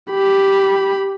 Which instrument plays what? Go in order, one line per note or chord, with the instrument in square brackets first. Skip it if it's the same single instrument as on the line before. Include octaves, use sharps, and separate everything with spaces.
[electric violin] G4 B5